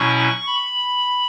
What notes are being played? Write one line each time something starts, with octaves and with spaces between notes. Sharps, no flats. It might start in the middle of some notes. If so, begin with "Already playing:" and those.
Already playing: B2 F#3 C#4 E4 C#6
B5